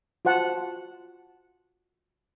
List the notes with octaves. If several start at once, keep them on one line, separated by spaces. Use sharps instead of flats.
F4 F#4 C5 F#5 A5